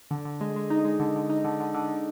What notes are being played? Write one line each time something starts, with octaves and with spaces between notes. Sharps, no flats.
D3
D3
G#3
G#3
D#4
G#3
D3
D3
D#4
D3
D3
D3
D3